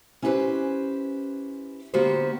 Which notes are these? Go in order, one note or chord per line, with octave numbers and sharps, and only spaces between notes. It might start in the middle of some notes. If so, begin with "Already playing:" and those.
C#4 E4 G4 G#4 B4 C5
D3 A#3 B3 F#4 G4 C5